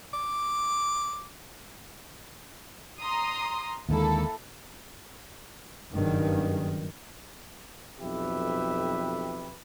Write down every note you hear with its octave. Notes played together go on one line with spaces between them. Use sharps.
D6
A#5 C6 D#6
D#2 D3 G#3 A#3 E4 A4
F#1 G2 D#3
B1 F2 G4 B4 E5